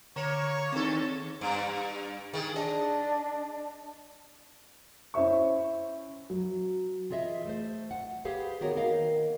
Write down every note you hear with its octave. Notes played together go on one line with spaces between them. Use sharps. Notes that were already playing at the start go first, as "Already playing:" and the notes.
D3 A#3 C#5 A#5
D#2 C4 D#4 A4
G2
D#3 G#4
D4 D#5
C#4 E4 C5 E5 C#6
F#3
E3 F4 G#4 D#5 E5
A3 C5
F#5
G4 G#4 B4 C5 F5
D#3 B3 F#4 A#4 B4 C#5
D#3 A#3 B3 A#4 D#5 F5